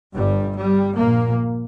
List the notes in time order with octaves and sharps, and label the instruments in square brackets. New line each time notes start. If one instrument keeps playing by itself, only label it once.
[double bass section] G1 G2 G3
G3
A#1 A#2 A#3